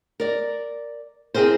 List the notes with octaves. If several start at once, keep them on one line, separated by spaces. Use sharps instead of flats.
A#4 D5
C4 E4 F#4 G#4 A#4 C5